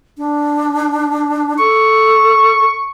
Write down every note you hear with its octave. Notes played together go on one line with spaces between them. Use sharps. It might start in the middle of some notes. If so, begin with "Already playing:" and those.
D4
A4 C#6